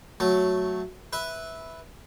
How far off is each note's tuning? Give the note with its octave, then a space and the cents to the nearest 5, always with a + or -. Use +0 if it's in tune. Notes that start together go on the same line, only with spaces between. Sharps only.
F#3 +0 A3 +0
B4 +0 E5 -10